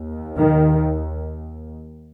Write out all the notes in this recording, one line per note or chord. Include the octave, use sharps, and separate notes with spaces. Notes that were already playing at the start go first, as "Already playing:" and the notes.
Already playing: D#2
D#3